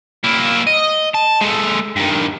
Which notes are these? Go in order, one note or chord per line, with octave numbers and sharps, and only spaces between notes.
A#3 E4
D#5
A5
G#3 A4
G2 D#3